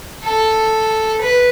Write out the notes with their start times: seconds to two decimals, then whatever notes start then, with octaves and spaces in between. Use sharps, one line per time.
0.25 A4
1.21 B4